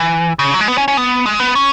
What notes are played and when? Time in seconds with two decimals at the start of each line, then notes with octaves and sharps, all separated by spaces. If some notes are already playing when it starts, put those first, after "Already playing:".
Already playing: E3
0.39 C#3
0.54 F#3
0.61 G#3
0.68 B3
0.78 C#4
0.88 C#4
0.97 B3
1.26 G#3
1.40 B3
1.55 C#4